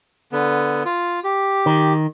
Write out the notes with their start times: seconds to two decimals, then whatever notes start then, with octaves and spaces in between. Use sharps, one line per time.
0.32 D3 B3
0.85 F4
1.24 G4
1.66 D#3